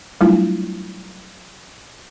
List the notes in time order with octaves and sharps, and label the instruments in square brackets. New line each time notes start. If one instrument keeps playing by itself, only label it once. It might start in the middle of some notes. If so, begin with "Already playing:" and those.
[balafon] F#3 G3 A3 D4 E4 F4